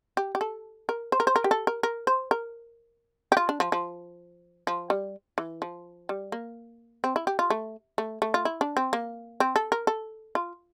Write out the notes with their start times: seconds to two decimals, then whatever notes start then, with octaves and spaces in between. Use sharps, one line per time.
0.17 G4
0.35 G4
0.41 A4
0.89 A#4
1.12 C5
1.20 A#4
1.27 C5
1.36 A#4
1.44 G4
1.51 A4
1.67 A#4
1.83 A#4
2.07 C5
2.31 A#4
3.32 G4
3.37 F4
3.49 D4
3.60 F3
3.72 F3
4.67 F3
4.90 G3
5.38 E3
5.62 F3
6.09 G3
6.32 A#3
7.04 C4
7.16 E4
7.27 G4
7.39 F4
7.50 A3
7.98 A3
8.22 A3
8.34 F4
8.45 E4
8.61 D4
8.77 C4
8.93 A#3
9.40 C4
9.56 A4
9.72 A#4
9.87 A4
10.35 F4